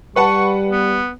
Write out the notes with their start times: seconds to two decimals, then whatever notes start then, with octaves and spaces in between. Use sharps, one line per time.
0.16 G3 B4 F#5 A5 C#6
0.72 B3